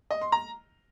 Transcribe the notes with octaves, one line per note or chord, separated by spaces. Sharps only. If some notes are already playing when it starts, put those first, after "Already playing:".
D#5
C6
A#5